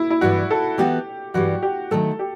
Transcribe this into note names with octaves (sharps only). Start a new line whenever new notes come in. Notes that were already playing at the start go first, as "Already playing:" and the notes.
Already playing: E4
E4
G2 E3 G3 F#4
A4
E3 B3 F#4 G4 A4
G2 E3 G3 F#4
G4
D#3 F#3 A3 A4
G4